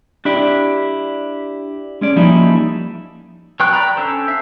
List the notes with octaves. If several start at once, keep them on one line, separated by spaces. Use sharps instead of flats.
D4 E4 G4 D5
G#3 C#4 D5
F3 G3 A#3 C#4 D#4 E4
F#3 B4 G5 C#6 F#6
D5 G5 A#5 B5
C#4 D4 A4 C5
E5 F5